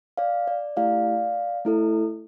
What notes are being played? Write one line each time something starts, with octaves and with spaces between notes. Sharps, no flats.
D5 F5
D5
A3 E4 G4 D5 F5
A3 E4 A4